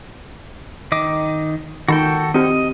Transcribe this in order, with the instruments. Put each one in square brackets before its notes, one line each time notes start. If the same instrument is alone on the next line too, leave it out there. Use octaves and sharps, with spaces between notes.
[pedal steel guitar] D#3 D#5 D6
[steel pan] D#3 [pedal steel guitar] F#4 A4 G5
[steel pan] C4 G4 [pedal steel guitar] D#5